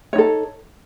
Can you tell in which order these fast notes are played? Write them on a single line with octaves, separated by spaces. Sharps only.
C#5 D#4 A4